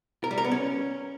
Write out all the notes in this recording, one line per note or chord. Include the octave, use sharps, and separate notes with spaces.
A#4
G3
A#4
B3
C#4